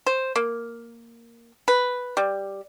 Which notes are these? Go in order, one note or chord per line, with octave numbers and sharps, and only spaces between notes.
C5
A#3
B4
G3